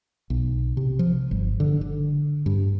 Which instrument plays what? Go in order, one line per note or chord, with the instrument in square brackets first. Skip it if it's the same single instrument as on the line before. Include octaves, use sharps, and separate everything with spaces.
[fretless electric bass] B1
C3
F3
G1
D3
D3
G2